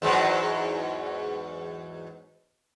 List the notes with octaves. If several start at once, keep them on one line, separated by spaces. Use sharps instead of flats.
E2 G#2 F#3